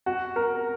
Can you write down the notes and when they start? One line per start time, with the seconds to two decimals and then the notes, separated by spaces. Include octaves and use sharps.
0.06 F#4
0.36 A#4